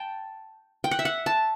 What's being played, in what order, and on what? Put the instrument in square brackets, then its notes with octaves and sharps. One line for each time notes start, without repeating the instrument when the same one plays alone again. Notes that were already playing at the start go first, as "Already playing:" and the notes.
Already playing: [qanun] G5 A5
G5
F#5
E5
F#5
A5